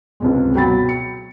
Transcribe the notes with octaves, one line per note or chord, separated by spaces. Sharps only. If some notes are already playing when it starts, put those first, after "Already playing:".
C#2 C3 G#3
B2 F#3 G5 B5 A6
C#7